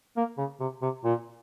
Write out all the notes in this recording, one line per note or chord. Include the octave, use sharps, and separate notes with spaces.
A#3
C#3
C3
C3
A#2